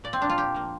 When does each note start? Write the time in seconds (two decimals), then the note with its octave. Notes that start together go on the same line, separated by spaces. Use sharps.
0.04 A#2 D5
0.13 C4
0.21 F3 A#3 D4
0.29 F4
0.37 A#2 G4
0.55 F3 A#3